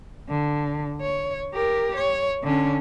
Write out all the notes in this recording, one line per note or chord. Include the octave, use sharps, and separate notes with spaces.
D3
C#5
G4 A#4
C#5
D3 C#4